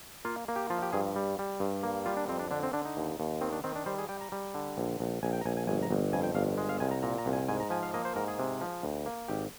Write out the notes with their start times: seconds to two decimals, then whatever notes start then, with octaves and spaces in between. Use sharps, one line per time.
0.25 A#3 F4
0.48 A#3
0.56 G4
0.70 F3 F4
0.82 G4
0.93 G2 G#4
1.16 G3
1.39 G3
1.60 G2
1.83 A#3
2.06 G3 F4
2.17 D4
2.28 F2 C4
2.39 D4
2.51 D3 D4
2.63 C4
2.73 D3 D4
2.85 D#4
2.97 D#2
3.20 D#2
3.41 D#3 C4
3.52 D4
3.64 D#3 C4
3.76 D4
3.86 G3 C5
3.98 G#4
4.09 G3 G5
4.21 A#5
4.32 G3
4.54 D3
4.78 A#1
5.00 A#1
5.23 A#1 G#5
5.33 G5
5.41 A#5
5.46 A#1 G#5
5.57 G#5
5.67 G1 G#5
5.83 A#5
5.91 G1
6.13 F2 G#5
6.23 G5
6.35 G1 F5
6.58 G#3
6.69 F5
6.80 C2 G#5
6.91 A#5
7.02 A#2 A#5
7.18 A#5
7.26 C2
7.33 G#5
7.48 G#2 G#5
7.60 A#5
7.70 F3 G#5
7.83 F5
7.94 A#3 D#5
8.05 C5
8.16 G#2 A#4
8.28 G#4
8.39 C3
8.61 F3
8.83 D2
9.06 A#3
9.28 G#1 G4